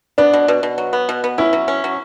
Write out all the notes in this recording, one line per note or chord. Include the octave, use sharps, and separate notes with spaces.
B3 D4
B2
B2
B2
F#3
B3
B2
B3
C#4 E4
F#3
C#4
F#3